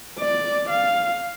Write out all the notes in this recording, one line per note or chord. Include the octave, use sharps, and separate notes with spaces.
D5
F5